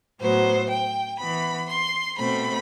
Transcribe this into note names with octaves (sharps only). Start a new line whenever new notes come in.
A2 F#3 B3 C5
G5
E3 B3 B5
C6
B2 A3 C4 B5